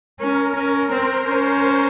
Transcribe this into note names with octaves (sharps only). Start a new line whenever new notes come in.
C#4 A#4
C#4
C4 C5
C#4